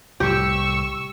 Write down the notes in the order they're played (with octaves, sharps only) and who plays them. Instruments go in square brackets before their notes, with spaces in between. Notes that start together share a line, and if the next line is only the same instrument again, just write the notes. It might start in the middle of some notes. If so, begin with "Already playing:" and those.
[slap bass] C2 A2 [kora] G4 [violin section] C#6 E6